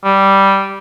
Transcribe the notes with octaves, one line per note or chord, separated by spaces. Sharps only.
G3